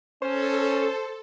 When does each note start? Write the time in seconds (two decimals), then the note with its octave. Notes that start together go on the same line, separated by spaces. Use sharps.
0.22 C#4 A4 C5